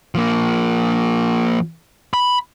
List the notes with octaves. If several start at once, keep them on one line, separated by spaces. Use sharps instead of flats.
F3 A#3
B5